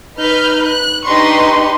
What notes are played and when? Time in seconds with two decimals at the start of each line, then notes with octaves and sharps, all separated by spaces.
0.18 D#4 B4 F6 G6
0.66 F#6
1.06 D4 D#4 G4 B4 C6 C#6